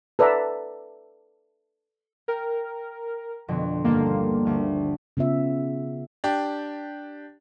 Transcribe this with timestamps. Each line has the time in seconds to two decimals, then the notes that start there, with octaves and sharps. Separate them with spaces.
0.19 A4 B4 D5 E5 A#5
2.28 A#4 G5
3.48 F2 B2 D3
3.84 G1 D#2 A#3 A4
4.06 C5
4.45 D2 F6
5.17 C#3 B3 F4 E5
6.24 D4 G4